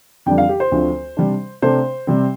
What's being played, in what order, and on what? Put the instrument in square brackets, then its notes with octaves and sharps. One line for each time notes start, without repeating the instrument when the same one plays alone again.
[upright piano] F2 D3 G3 D4 G5
F5
G4
C5
D2 D3 F3 C4
C3 G3 D4
C3 A3 D4 C5
C3 G3 C4